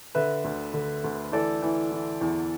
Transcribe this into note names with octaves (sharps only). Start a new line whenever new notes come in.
D3 B4 E5
D2
D3
D2
E3 A4 D5
E3
E3
E2